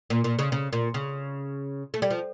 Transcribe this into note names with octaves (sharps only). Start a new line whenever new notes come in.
A#2
A#2
C#3
C#3
A#2
C#3
A3
G3
F3